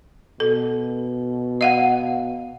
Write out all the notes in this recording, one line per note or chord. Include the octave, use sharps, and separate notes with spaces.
B2 A4
D#5 F5 F#5